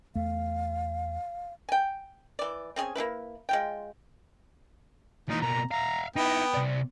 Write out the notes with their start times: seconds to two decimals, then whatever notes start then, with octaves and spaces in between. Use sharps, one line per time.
0.15 E2 A3 F5
1.69 G5 G#5
2.39 E3 D5
2.76 C4 C#4 G#4 G#5
2.95 A#3 D4 E4 B4
3.49 G#3 F4 G5
5.29 A#2 E3 D#4
5.42 B2 A#3 A#5
5.71 E5 F5 A#5
6.16 B3 D#4 E4 G5
6.54 C3 D5